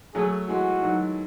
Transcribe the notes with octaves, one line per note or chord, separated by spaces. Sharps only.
F#3 A3 G#4
E3 G#3 F#4
D#3 F#3